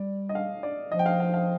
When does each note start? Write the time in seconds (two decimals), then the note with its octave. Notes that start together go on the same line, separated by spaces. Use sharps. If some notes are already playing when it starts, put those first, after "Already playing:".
Already playing: G3 D5
0.29 D#5
0.35 F5
0.63 D5
0.92 F3 D#5
0.99 G5
1.06 F5
1.20 F5
1.34 F5